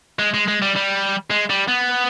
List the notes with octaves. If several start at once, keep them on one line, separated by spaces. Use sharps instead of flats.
G#3
G#3
G#3
G3
G3
G#3
G3
B3